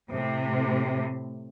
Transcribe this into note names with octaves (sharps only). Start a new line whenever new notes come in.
A2 C3